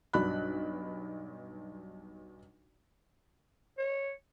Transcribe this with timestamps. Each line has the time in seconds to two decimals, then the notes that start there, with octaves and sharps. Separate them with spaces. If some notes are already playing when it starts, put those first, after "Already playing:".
0.13 B1 G2 D4 F#4 B5 F#6
3.78 C#5